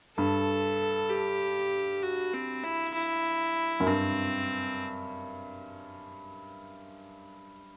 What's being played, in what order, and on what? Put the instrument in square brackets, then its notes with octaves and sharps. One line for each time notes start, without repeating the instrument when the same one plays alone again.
[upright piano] G2 [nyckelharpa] A4
[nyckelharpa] G4
F#4
C4
E4
E4
[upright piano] F#2
[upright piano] G2 [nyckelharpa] C4